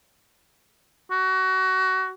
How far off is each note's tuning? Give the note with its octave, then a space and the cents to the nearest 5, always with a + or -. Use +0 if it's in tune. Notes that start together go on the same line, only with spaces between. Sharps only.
F#4 +25